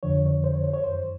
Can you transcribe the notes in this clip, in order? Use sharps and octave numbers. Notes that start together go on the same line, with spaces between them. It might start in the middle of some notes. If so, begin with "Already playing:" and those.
F2 D3 F3 C#5
C#5
C5
C#5
C5
C#5
F#2 D#3 C5